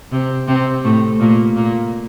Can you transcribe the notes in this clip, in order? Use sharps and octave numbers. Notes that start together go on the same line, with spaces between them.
C3 C4
C3 C4
A2 A3
A#2 A#3
A#2 A#3